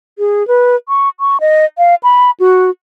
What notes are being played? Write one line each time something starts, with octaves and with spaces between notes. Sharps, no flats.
G#4
B4
C#6
C#6
D#5
F5
B5
F#4